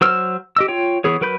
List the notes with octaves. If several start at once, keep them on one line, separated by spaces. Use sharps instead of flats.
F#3 C5 E6 F6
G4 D#5 E6
F4 C#5 G5
E3 B3 G#4 C#5
F#3 A#4 B4 B5 G6